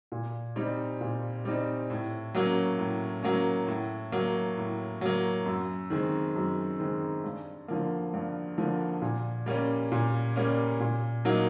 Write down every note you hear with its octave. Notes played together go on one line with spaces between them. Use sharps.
A#2
G3 C4 D#4
A#2
G3 C4 D#4
A2
F#3 A#3 C#4
A2
F#3 A#3 C#4
A2
F#3 A#3
A2
F#3 A#3
F#2
D#3 G#3 C4
F#2
D#3 G#3 C4
G2
D3 F3 A#3
G2
D3 F3 A#3
A#2
G3 A#3 C#4
A#2
G3 A#3 C#4
A#2
F#3 A#3 D#4